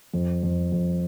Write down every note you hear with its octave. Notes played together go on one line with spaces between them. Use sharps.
F2
F2
F2